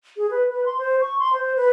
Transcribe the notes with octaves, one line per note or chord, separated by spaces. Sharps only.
G#4
B4
B4
C6
C5
C#6
C6
C5
B4